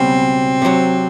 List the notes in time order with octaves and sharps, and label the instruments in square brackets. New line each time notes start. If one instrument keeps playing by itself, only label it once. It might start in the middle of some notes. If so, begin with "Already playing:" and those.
Already playing: [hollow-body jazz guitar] C#2 B2 G3 C#4 [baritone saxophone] C4
[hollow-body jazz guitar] C3 D#3 F#3